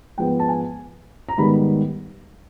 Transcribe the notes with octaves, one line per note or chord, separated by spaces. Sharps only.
G#2 F3 G#3 B3 G5
A5
G#5
A#5
G#2 D#3 G3 B3 B5